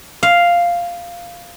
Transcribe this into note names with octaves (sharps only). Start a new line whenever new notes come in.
F5